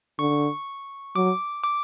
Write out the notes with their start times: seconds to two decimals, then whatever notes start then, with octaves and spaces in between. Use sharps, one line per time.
0.19 D3 C#6
1.16 F#3 D6
1.64 D6